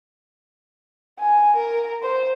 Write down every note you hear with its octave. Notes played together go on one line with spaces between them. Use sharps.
G#5
A#4
C5